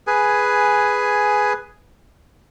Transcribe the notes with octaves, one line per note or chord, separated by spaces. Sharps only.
G#4 B4 G#5